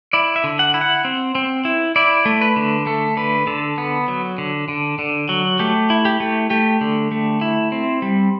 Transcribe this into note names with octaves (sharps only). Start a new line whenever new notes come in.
E4 D5
E5
D3
F#5
E4
F#5
C4
C4
E4
E4 D5
A3
B4
D3
A3 A4
D3 B4
D3 A4
B3
F#3
D3
D3
D3
F#3
A3 G4
E4
G4
A3
A3 G4
D3
A3
E4
C4
G3